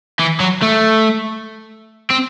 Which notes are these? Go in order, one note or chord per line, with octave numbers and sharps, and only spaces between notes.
E3
F#3
A3
C4